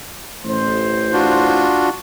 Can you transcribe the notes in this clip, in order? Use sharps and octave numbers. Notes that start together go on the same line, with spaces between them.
A1 A2 C5
D4 F4 F#4